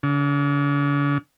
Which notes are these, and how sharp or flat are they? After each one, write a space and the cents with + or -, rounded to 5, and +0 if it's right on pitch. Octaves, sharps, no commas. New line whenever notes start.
D3 -45